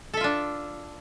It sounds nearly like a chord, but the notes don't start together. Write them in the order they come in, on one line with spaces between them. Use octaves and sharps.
A4 E5 F4 D4